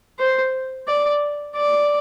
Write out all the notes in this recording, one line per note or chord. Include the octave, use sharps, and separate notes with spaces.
C5
D5
D5